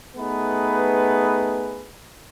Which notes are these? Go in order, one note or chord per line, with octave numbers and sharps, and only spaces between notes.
A3 B3 D#4 G#4 B4